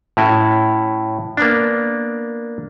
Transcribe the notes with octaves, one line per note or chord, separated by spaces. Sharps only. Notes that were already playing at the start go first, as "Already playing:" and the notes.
A2 C#4 E4 F#4
A#3 B3 D4